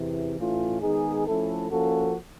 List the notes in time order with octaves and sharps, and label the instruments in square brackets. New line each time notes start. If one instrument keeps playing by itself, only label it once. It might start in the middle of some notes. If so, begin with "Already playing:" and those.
Already playing: [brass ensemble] E2 C3 E3
A2 E3 A3 C#4 F4
D#3 G#3 B3 D#4 G#4
F3 A3 C#4 E4 A4
F3 A#3 C#4 F#4 A4